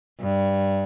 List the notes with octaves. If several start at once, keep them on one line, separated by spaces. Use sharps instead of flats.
G2